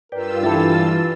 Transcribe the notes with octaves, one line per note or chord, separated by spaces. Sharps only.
G2 F4 A#4 B4 D5 G5 E6
E3 E4 G4 A4 A6